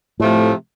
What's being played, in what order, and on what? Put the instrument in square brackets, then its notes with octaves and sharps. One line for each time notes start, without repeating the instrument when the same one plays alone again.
[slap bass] A2 [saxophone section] C3 F3 A3